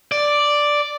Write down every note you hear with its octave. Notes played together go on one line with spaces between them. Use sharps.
D5